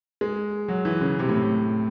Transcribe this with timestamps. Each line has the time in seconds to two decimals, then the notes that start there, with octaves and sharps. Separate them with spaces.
0.21 G#3
0.68 F#3
0.85 E3
1.01 C#3
1.19 C3
1.29 A2